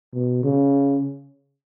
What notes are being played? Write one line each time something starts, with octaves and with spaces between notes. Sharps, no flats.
B2
C#3